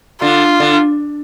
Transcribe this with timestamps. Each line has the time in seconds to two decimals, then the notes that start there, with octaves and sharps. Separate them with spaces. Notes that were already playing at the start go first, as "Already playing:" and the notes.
0.22 D3 F4
0.60 D3